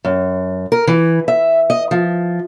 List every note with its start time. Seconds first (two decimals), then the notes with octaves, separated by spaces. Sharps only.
0.05 F#2
0.72 A#4
0.87 E3
1.28 E5
1.70 D#5
1.91 F3